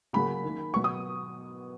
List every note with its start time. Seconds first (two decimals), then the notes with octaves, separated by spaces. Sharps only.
0.13 C#3 F#3 A#3 B5
0.44 D#3 A#3
0.74 B2 F#3 B3 C#6
0.84 D#6